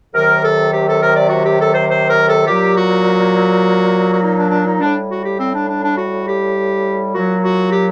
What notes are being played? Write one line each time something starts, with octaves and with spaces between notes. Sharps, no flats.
C3 D#3 F#3 A#4
A4
G4
A4
A#4
D5
F#4
G4
A4
C5
C5
A#4
A4
A#2 F#3 G4
F#4
F#4
D#4
D4
D4
D#4
A2 G3 D4
F#4
G4
C4
D4
D4
D4
F#4
G4
A#2 F#3 F#4
F#4
G4